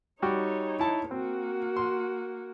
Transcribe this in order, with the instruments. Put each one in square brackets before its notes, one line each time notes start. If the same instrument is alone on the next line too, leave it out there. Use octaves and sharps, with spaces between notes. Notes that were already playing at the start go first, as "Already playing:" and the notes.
[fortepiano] G3 F#4 G4 [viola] D#4 C#5
[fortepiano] E4 A5
[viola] A#3 F#4 [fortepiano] C4
[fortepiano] C6